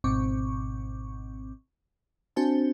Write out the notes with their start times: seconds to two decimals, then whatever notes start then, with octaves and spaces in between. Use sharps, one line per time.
0.04 G#1 G#2 B2 C4 C#6 D6
2.36 C4 D4 F#4 C5 G#5 A5